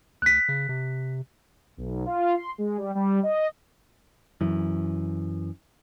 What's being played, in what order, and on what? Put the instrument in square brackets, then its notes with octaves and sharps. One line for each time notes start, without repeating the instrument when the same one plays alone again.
[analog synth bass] D2 [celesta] F#6 B6
[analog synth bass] C#3
C3
[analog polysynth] B1
F4
C6
G#3
G3
G3
D#5
[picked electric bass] F#2 E3